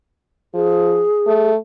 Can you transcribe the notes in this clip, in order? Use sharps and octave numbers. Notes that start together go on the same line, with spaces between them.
F3 G#4
A3